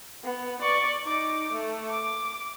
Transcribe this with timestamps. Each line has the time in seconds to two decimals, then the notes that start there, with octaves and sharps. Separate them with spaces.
0.24 B3
0.61 D5 C#6
1.04 D#4 D6
1.52 A3
1.91 D6